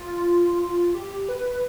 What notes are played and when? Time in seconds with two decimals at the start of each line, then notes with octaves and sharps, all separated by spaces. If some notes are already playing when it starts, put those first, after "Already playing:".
Already playing: F4
0.95 G4
1.29 B4